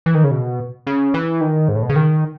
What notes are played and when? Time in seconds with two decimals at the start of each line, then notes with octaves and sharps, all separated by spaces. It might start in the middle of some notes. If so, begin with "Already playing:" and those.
0.06 E3
0.15 D#3
0.24 C#3
0.31 B2
0.87 C#3
1.14 E3
1.41 D#3
1.69 G#2
1.76 A2
1.82 B2
1.89 C#3
1.96 D#3